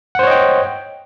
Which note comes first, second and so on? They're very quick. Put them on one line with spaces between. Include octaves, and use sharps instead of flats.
F#5 C5 C#5 D#5 G5